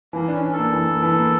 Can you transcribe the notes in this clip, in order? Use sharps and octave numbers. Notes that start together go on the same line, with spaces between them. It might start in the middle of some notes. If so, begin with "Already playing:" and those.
E3 A#3
D4
C#4
D4
A4
A#3
E3
A#3
E3
A#3